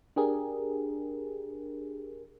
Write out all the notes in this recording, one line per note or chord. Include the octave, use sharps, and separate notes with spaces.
D4 G4 G#4 A#4